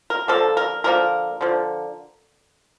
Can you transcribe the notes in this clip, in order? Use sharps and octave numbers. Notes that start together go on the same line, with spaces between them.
A#4
D3 F3 A#3 A4
A#4
D3 F3 A#3 A#4
D3 F3